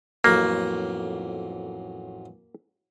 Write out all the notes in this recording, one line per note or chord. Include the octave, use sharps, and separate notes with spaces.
A1 F2 F#3 A#3